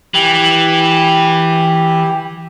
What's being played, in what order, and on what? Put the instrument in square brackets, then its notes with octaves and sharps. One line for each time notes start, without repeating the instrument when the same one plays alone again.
[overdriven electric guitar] E3 [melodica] G4